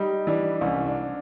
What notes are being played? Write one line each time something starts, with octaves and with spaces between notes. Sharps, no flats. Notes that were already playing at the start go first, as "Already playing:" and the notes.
Already playing: G3 D#4
E3 D4
C2 C#4
D4